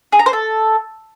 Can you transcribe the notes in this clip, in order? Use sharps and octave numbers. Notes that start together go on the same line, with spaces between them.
G#4
A#5
C5
A4